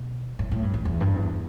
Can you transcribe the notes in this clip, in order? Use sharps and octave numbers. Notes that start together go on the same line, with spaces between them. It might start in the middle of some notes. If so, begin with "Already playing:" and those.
Already playing: B2
A2
A2
G2
E2
E2
G2
E2